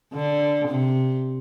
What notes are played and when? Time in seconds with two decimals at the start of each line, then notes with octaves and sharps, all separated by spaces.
0.13 D3
0.68 C3